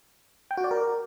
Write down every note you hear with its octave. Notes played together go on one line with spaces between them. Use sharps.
G5
F#4
D5
A#4